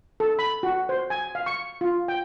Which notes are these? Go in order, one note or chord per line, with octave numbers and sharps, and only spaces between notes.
A4
B5
F#4
C5
G#5
F5
C#6
F4
G5